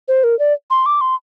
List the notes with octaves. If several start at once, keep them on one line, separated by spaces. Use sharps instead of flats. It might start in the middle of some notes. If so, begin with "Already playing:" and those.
C5
A#4
D5
C6
D6
C6